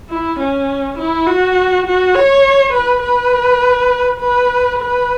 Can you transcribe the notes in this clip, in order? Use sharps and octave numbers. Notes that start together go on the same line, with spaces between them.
E4
C#4
E4
F#4
F#4
C#5
B4
B4
B4
B4